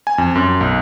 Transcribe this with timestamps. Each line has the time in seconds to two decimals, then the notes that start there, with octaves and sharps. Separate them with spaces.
0.07 G#5
0.18 F2
0.35 F#2
0.61 B1